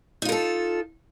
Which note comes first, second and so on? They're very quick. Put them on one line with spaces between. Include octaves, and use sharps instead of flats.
D#4 F4 A#4 A4